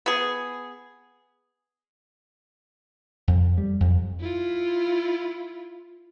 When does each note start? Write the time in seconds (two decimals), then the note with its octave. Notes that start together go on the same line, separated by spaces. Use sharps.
0.06 B3 G#4
3.28 F2
3.58 G3
3.80 F2
4.20 E4 F4